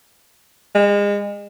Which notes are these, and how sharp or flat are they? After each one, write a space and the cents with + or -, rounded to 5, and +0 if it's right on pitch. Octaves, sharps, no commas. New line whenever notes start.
G#3 -35